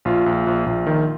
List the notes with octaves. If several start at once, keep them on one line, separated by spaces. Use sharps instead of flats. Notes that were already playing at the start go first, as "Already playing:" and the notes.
A#1 F4
A#1
A#1
A#1
D#3